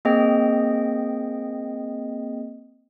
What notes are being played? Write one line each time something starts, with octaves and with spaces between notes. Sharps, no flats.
A#3 C4 G#4 D#5 G5